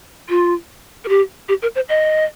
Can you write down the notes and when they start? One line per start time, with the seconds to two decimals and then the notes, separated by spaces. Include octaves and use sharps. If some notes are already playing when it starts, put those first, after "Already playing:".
0.29 F4
1.05 A#4
1.09 G4
1.49 G4
1.62 A#4
1.75 C5
1.89 D#5